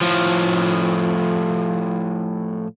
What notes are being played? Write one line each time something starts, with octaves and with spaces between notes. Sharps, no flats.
A2 F3